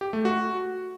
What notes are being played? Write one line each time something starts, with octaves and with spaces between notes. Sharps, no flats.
G4
A3
F#4